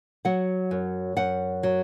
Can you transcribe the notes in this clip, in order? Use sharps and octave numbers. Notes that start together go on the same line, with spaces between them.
F#3 F#5
F#2
F#2 F#5
F#3